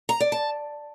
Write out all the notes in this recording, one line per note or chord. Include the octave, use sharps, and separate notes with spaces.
A#5
D5
A5